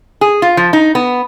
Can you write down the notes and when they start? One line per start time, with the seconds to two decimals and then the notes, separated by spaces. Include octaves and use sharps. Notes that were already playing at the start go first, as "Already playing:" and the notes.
0.21 G#4
0.42 F4
0.57 F3
0.73 D#4
0.95 B3